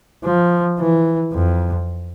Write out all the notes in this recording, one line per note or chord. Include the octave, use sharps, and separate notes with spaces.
F3
E3
F2